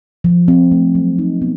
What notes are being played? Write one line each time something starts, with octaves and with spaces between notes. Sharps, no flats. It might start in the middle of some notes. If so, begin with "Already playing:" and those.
F3
C4
A3
F#3
D#4
B3